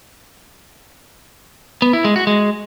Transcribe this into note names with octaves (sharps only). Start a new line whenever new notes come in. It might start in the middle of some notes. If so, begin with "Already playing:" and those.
B3
E4
G#3
F#4
G#3